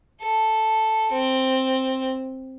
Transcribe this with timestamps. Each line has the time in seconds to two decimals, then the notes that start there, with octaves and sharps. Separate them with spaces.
0.21 A4
1.12 C4